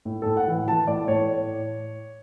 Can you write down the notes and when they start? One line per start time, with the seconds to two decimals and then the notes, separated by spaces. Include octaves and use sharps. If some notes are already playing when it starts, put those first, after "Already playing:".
0.05 A2
0.22 A2 A4
0.37 F#5
0.48 E3
0.68 E3 A5
0.87 A2 D5
1.08 A2 C#5